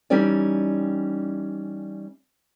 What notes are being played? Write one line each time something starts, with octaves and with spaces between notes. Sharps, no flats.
E3 G3 C#4 D#4 G4 D5